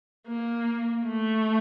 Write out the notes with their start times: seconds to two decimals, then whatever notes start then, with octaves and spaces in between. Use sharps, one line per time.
0.27 A#3
1.06 A3